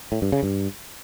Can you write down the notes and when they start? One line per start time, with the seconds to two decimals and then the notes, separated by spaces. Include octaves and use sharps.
0.12 A2
0.22 G2
0.32 C#3
0.43 G2